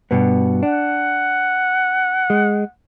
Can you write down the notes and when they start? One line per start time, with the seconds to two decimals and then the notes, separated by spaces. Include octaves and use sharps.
0.11 G2 B2 B3
0.63 D4 F#5
2.30 G#3